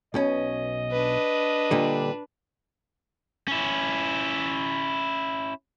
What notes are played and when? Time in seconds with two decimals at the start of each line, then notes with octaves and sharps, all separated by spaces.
0.14 B1 B2 C#4 D#5
0.92 D4 B4
1.71 A#2 D3 G3
3.48 C#4 E4